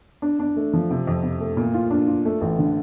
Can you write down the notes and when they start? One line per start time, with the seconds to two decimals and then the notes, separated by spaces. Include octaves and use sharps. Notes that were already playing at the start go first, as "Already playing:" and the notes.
0.22 D4
0.39 D4
0.56 A3
0.73 F3
0.90 C3
1.07 F2
1.23 C3
1.40 A3
1.57 A#2
1.74 F4
1.91 D4
2.07 F4
2.25 A3
2.41 A1
2.58 D3